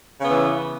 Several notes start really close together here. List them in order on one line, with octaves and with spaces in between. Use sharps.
C#3 B3 E3